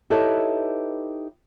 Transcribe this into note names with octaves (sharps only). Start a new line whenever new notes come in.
D#4 E4 G4 A4 B4 C#5